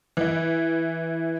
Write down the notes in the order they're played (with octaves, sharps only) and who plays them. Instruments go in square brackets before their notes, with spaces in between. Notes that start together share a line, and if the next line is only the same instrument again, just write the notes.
[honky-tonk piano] E3 E4